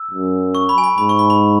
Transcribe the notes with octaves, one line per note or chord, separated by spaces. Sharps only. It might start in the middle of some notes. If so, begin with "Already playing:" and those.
Already playing: E6
F#2
C#6
B5
G#5
B5
G#2 B5
C#6
B5
B5